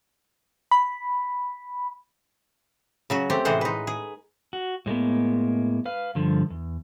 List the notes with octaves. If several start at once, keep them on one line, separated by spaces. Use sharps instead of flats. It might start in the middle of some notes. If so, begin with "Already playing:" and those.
B5
C#3 F#3 F#4
A3 C4 G4
A2 C3 E3 G#3 C5 F#5
D#4 B4
G#4
F#4
A2 G#3 A#3 B3
B4 F5
G2 D3 F3
E2